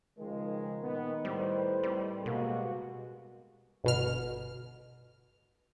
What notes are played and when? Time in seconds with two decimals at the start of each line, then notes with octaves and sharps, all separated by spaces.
0.19 C#2 D#3 F3 G#3
0.83 A#2 B3
1.25 A2 G3 B4 C5
1.83 G3 C4 D#4 A4
2.26 B2 G3 G#3 A#3 F#4
3.84 G1 B2 F6